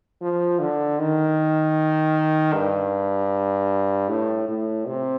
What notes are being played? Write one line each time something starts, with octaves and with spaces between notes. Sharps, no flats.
F3
D3
D#3
G2
A2
A2
C3